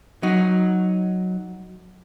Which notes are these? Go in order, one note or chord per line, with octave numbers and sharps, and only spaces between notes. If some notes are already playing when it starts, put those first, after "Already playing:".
F#3 D#4